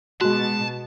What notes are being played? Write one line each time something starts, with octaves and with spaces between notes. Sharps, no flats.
B2 G#3 F#4 A5 F#6